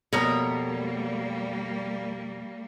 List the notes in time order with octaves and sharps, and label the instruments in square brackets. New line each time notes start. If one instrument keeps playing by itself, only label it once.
[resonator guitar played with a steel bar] F2 B2 [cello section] G3 A#3 [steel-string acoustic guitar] A#4 C#5 A#5